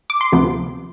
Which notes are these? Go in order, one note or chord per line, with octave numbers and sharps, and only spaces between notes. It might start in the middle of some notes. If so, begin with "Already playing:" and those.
D6
C6
D2 C3 F3 B3